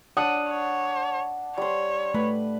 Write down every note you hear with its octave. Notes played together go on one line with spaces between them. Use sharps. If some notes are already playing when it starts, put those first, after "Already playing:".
D4 F#5 D#6 D#7
C#5
G3 C5 C#5
A3 B4